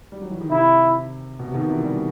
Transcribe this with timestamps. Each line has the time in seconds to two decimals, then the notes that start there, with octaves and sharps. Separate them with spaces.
0.12 G3
0.22 F#3
0.31 E3
0.41 D#3
0.50 C3 E4
1.39 B2
1.47 C3
1.54 B2 D#3
1.69 C3 E3
1.84 E3 G3